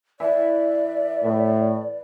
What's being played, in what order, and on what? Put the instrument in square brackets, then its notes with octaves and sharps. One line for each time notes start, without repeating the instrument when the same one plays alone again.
[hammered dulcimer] E3 [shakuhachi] D5 [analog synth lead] E5
[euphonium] A2